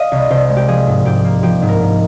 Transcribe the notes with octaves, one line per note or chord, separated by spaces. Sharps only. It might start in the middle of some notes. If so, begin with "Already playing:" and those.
Already playing: D#5 F5
C2
C2 C5
G#3
G4
F3 G#4
G#2
G#2 G4
A#3
F3 G4
G#2
A#4
G#2